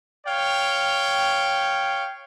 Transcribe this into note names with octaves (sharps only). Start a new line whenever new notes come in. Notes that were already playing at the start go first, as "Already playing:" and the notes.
C#5 F5 G5